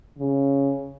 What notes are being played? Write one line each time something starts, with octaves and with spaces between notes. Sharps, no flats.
C#3